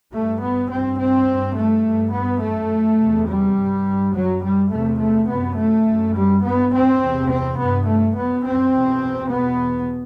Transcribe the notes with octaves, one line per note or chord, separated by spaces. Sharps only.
G2 A3
B3
G2 C4
C4
G2
A3
G2
B3
F#2 A3
E2 C3
G3
G2
F#2 F#3
G3
E2 C3 A3
A3
F#2 B3
A3
F#2
G3
G2 B3
C4
E2 C3
C4
G2 B3
A3
F#2 B3
C4
E2 B2
E2 B2 B3